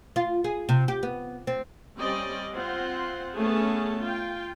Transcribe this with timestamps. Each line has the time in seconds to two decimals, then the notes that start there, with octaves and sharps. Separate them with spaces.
0.16 F4
0.44 G#4
0.69 C3
0.88 G4
1.03 B3
1.47 C4
1.98 G3 C4 C#4 D5 D#5
2.54 C4 F4 F#5 C6
3.35 A3 B3 C#4 G#4 C#5 A5
3.99 F4 G5